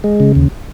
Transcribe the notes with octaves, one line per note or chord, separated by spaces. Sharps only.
G#3
C#3
D#2